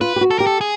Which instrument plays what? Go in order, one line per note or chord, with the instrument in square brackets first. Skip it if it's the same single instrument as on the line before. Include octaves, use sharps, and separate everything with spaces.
[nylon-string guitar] F4 [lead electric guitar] B4
[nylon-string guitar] G4
F#4
[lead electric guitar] A4
[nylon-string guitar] G4 [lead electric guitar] A#4
[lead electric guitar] A4
G#4